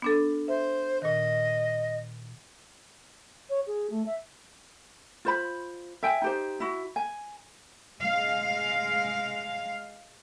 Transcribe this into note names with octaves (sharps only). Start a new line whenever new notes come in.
B3 D4 A4
C5 E5
A#2 D#3 D#5
C#5
G#4
A3
E5
F4 C5 B5
E5 G5 G#5
D#4 G4 C5
E4 F#4
G#5
G#3 F5